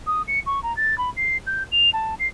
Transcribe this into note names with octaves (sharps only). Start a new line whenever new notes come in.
D#6
C#7
C#6
A#5
A6
B5
C7
G6
F7
A5
C7